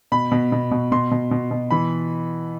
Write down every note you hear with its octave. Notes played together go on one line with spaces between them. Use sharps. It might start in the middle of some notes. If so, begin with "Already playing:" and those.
B2 B5
B2
B2
B2
B2 C6
B2
B2
B2
E3 B5